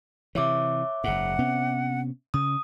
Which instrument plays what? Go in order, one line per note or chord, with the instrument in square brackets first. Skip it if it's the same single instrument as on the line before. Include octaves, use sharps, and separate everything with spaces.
[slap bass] C3 E3 [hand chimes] C#5 E5 D6
[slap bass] F#1 G#2 [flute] F#5
[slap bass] C3 B3 C#4
[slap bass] C#3 [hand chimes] D#6